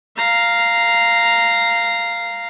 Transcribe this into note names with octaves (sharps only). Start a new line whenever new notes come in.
F5 A#5